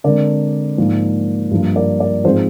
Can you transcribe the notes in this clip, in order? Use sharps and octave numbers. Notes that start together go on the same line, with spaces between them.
D3 G#3 C4 A#4 D5
G#2 F3 A#3
G2 F3 A#3
A#4 D5
A#4 D5
G#2 F3 C4 G#4 C5